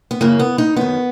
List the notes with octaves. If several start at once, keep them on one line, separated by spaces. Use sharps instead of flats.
B3
F#2 C#3 E3 A#3
B3
D#4
F#2 D#3 B3